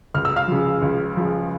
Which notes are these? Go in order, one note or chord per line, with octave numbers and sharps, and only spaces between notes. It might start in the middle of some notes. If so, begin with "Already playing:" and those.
C#2 F6
E6
F5 F6
C#3 F3
C#2
C#3 F3